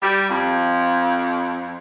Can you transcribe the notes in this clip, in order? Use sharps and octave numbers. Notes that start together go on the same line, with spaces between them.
G3
F2